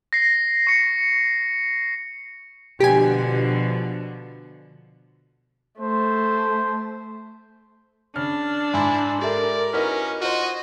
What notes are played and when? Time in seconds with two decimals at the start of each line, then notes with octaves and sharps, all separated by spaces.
0.13 A#6 C7
0.67 C#6 C#7
2.80 B2 D3 F3 G4 G#5
5.80 A3 C5
8.16 C#3 D4 F6
8.74 G#2 E4 G#5 B5 E6
9.22 G4 A4 A#4 D5 E5
9.73 C#4 D#4 E4 F#4 B4 F6 B6
10.21 F4 F#4 C5 D#5